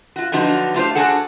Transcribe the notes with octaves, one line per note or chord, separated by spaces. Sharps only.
F4 F#4
D3 F3 F#3 B3 D#4 F#4
A3 F4 G4 C5
D4 F#4 G#4 A4 F#5